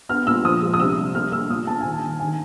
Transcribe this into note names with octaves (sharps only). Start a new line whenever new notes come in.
B3 F6
A#2 E6
F3 D#6
G#3
D#6
C3 E6
G3
A#3 F6
A#3 E6
A#2 D#6
A#2 A5
D#3 G#5
A5
D#3
D#3 G#5